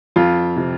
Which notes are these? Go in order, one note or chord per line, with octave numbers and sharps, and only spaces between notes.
F2 F4
C3